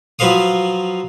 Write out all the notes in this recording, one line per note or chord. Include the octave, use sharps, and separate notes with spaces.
F3 F#3 B4 C5 F5 D#6